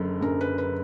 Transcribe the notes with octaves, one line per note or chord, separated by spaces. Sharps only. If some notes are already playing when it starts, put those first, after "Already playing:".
Already playing: F#1 F#2 D3 A#4
F#1 F#2 D3 A#4
B4
B4